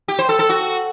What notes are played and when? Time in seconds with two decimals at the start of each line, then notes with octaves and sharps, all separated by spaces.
0.08 G4
0.19 C5
0.29 A4
0.39 A4
0.49 F#4